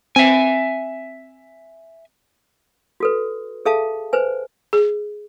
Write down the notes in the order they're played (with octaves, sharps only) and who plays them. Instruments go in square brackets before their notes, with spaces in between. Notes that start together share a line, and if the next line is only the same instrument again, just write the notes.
[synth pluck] C4 [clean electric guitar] E5 G#5
[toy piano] F#4 A4 B4
G#4 A4 E5 F5 A5
B4 C5 G#5
[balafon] G#4